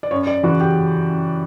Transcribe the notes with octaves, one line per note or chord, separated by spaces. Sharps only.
D5
F#2 C#5
D5
C#3 E3 F#4
G4